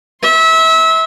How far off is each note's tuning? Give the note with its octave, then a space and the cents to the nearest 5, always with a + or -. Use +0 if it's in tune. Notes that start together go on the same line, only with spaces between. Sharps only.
E5 -25 C6 +0